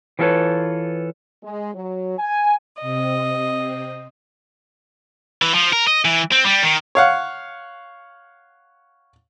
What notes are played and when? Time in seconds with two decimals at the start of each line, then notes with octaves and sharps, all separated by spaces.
0.19 E3 F#3 F4 A4 B4 C#5
1.43 G#3
1.74 F#3
2.19 G#5
2.81 C3 C4 D#5
5.42 E3
5.54 F3
5.73 A#4
5.87 D#5
6.05 E3
6.32 C4
6.45 G3
6.63 D#3
6.95 C#5 F5 F#5